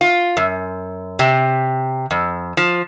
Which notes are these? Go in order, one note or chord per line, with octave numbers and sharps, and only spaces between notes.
F4
F#2
C3
F2
F3